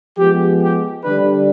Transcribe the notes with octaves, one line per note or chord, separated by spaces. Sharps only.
F3 G#3 B3 G4
G4
D3 G3 D4 B4